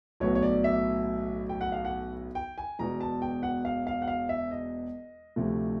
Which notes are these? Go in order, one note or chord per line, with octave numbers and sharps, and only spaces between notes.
B1 A2 F#3 B3 C#5
C#5
D5
E5
G5
F#5
F5
F#5
G5
G#5
E1 E2 B2 A#5
A5
G5
F#5
F5
F5
F#5
F5
E5
D#5
D2 C3 F3 A3